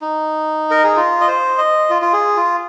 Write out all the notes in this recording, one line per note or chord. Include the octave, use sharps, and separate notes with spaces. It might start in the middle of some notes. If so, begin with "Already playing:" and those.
D#4
A#4
G#4
F4
D#5
C5
D#5
F4
F4
G#4
F4